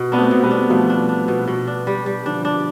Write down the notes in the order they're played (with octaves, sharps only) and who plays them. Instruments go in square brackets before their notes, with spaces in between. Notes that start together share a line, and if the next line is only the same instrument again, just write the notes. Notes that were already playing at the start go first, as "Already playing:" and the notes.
Already playing: [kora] B2
[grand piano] B3 [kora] D4
[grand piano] A3 C4
[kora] B2
[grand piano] G3 B3
[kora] D4
[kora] B2 [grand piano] F3 A3
[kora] D4
D4
B2
B2
D4
G3
G3
[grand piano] D3 F3 [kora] D4
[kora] D4